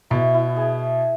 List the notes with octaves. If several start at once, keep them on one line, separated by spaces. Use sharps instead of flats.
B2 E4
E4
G#4